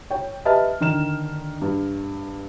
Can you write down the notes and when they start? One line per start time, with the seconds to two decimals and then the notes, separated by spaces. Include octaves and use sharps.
0.10 C#5 G5
0.45 G4 B4 D#5 E5 A5 F6
0.80 D3 D#3 F6 E7
1.61 G2